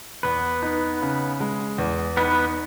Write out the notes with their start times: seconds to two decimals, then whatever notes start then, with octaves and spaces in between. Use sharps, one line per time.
0.23 E2 B3 B4
0.62 D#4
1.02 C#3
1.40 G#3
1.78 E2
2.17 B3 D#4 B4